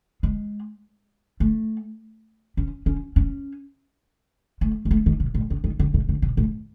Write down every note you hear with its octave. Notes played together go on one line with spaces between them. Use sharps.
G#3
A3
C#4
C#4
C#4
A3
G#3
A3
D#3
B2
A2
C#3
D#3
C#3
B2
C#3
B2
A2